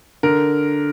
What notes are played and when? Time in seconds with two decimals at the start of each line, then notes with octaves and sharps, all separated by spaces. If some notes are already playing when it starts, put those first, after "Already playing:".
0.23 D3 A#4